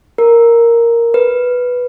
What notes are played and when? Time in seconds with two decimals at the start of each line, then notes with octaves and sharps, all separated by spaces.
0.18 A#4
1.14 B4